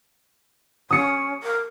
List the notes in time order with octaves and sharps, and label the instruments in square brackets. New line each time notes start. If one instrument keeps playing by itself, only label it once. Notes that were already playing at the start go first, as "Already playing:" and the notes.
[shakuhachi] C#4 [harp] D#6 C#7
[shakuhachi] A#4